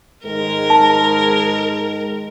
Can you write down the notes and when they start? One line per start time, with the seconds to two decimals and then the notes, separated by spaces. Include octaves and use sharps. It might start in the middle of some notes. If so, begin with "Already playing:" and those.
0.25 G#2 D#3 G#3 A#4
0.70 A5